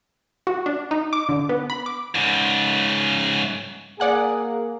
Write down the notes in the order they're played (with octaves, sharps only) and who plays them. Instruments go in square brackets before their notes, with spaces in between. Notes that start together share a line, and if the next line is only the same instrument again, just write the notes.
[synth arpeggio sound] F#4
D4
D#4
D6
D3
B3
B5
D6
[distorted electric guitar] G#2 C#3
[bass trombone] A#3 [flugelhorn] G#4 [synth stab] D5 F#5 G#5